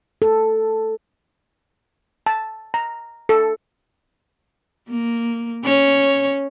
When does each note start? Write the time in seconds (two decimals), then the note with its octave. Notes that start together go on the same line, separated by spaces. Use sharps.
0.22 A4
2.26 A5
2.74 A#5
3.29 A4
4.89 A#3
5.64 C#4 C#5